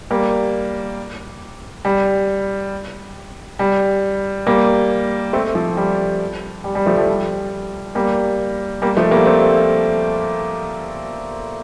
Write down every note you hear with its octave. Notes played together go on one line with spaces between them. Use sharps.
G3 A#3
G3
G3
G3 A#3
A3 C4
F3
G3
G3
G3
F3 A3
F3
G3
G3 A#3
G3 A#3
F3 A3
G3 A#3
A3 C4